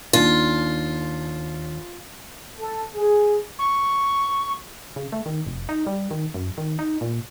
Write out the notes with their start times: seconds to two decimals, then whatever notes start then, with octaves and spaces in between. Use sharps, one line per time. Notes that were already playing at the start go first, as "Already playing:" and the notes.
0.13 D#2 D4 F4
2.60 A4
2.96 G#4
3.59 C#6
4.96 C#3
5.12 A3
5.26 D#3
5.46 F1
5.69 D#4
5.87 G3
6.11 D#3
6.34 F#2
6.58 D#3
6.79 D#4
7.01 A#2